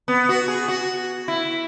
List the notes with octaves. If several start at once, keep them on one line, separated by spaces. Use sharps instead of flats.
B3
F#4
G#4
F#4
E4